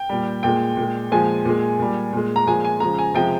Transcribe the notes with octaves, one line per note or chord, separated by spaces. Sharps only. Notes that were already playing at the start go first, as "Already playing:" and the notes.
Already playing: G5
A#2 G3
A#2 G#3 G5
A#2 G#3
A#2 F3 G#3 G#5
A#2 G#3
A#2 G3
A#2 G#3
A#5
A#2 F3 G#3 G#5
G#5
C#3 F3 G#3 A#5
G#5
C3 F3 G#3 G5